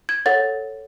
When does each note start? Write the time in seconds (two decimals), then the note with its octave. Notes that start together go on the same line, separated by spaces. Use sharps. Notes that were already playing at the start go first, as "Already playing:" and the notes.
0.09 G#6
0.26 A4 C#5 F#5 A6